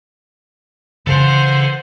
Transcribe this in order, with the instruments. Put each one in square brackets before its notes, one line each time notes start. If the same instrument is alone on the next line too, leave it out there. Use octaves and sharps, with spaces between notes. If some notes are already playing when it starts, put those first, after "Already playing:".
[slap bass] C#3 E3 [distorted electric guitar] A4 F#5 [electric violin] C5